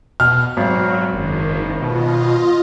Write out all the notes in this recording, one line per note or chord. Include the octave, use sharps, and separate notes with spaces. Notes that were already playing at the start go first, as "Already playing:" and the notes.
B2 F6
G#1 F#3
F#1 D#3
B2 F4 D#5